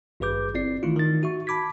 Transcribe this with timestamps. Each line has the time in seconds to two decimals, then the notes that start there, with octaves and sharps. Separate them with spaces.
0.20 G#1 G2 G#4 B4 D6 G6
0.54 G1 C4 E4 D5 C7
0.83 D#3 E3 A3 E4 F4
0.96 D#3 A6
1.23 F#4 E5 C#6
1.47 A5 B5 D6 G#6 B6